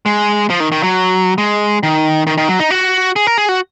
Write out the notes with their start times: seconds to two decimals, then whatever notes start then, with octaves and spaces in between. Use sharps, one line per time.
0.06 G#3
0.50 F3
0.60 D#3
0.72 D#3
0.83 F#3
1.38 G#3
1.83 D#3
2.27 D#3
2.37 D#3
2.49 F#3
2.59 D#4
2.70 F#4
3.16 G#4
3.27 A#4
3.38 G#4
3.49 F#4